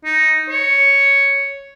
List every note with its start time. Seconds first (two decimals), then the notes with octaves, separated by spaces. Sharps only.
0.05 D#4
0.50 C#5